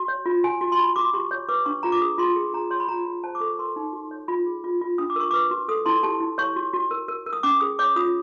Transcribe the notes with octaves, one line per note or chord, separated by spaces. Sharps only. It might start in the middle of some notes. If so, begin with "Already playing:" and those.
Already playing: F#4
C#5
F4
F#4 G#5
F#4
C6
F#4 B5
F#4 D6
G4 C#6
C#5
B4 D6
D4 C#6
F4 A#5
D6
G#4 D#6
F4 C6
G#4
G#4 A#5
C#5 C6
B5
F4 A#5
F4
C5 A5
D6
A4 C#6
A#4 C6
D#4
F#4
C#5
F4 B5
G#4
F4
F4
D4 D#6
D6
A#4 C#6
B4 D6
F#4
A4 D#6
E4 C6
G4 A5
E4
C#5 C#6
F#4
F#4
A#4
A#4
A#4
D#6
C#4 D6
G#4 D#6
C#5 D6
F4 D#6